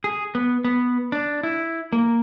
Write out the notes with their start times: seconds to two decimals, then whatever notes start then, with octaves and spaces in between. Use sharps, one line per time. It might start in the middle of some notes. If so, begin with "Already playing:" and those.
0.04 G#4
0.35 B3
0.64 B3
1.12 D4
1.43 E4
1.93 A#3